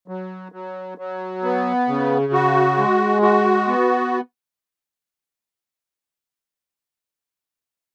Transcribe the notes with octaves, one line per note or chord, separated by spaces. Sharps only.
F#3
F#3
F#3
B3
C#3
F#4
G#3
F#4
B3